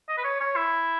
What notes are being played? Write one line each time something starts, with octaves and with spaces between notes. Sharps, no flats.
D#5
B4
C#5
C#5
E4